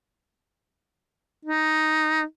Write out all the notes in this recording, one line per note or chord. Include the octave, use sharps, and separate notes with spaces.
D#4